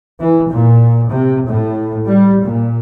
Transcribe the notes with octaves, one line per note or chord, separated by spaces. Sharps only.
E3
A#2
C3
A2
G3
A#2